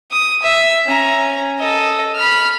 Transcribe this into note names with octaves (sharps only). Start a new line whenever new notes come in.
D#6
E5
C#4 A#5
A4 D#5
B5 F6